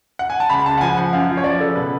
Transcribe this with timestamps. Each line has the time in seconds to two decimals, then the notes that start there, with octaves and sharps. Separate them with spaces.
0.19 F#5
0.30 G#5
0.40 A5
0.50 C#2 B5
0.66 C#2 A5
0.77 F#5
0.81 F3 G#5
0.97 F3 F#5
1.13 F#2 F5
1.29 F3
1.37 C#5
1.44 F3 D5
1.60 C#3 A4
1.75 B2 B4